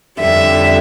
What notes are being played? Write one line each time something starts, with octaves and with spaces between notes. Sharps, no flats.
F2 D3 G3 E5